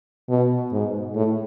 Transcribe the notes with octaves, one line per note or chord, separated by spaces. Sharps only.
B2
G#2
A2